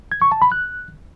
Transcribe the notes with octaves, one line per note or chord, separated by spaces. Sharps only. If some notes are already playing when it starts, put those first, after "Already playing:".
G#6
C#6
A5
B5
F#6